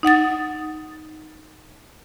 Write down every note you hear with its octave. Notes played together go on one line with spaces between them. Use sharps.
D#4 F#5 D#6 A6